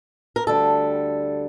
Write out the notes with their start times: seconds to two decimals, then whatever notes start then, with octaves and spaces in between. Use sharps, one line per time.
0.36 A#4
0.47 D2 D3 G3 A4